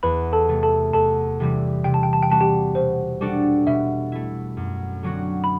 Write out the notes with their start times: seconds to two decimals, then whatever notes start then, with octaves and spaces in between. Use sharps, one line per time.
0.03 E2 B4 B5
0.33 A4 A5
0.49 C3 E3 A3
0.63 A4 A5
0.93 E2 A4 A5
1.40 C3 E3 G3
1.84 C3 G5
1.94 A5
2.03 G5
2.13 A5
2.23 G5
2.30 G3 C4 F#4 B4 A5
2.41 G4 G5
2.75 B2 C5
3.21 G3 D4 F#4 A4
3.67 B2 E5
4.12 A3 E4
4.57 F#2
5.03 D3 F#3 C4 F#4
5.44 B5